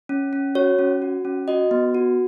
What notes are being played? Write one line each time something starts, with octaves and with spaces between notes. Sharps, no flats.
C#4
C#4
F#4 C#5
C#4
F#4
C#4
F#4 D#5
B3
F#4